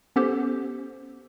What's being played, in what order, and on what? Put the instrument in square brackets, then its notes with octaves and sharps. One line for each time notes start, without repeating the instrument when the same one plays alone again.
[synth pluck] B3 C#4 G4 A4 C5